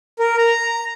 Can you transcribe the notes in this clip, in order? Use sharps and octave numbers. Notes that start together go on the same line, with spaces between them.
A#4
A#5